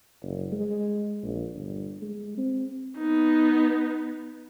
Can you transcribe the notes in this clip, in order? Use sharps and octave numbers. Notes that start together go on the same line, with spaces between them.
F#1
G#3
A#1
G1
G#3
C4
B3 D#4